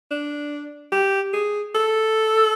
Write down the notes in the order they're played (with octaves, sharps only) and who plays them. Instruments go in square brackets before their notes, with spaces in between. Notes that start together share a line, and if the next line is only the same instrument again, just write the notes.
[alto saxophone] D4
G4
G#4
A4